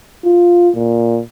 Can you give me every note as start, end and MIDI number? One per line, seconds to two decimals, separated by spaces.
0.25 0.71 65
0.75 1.20 46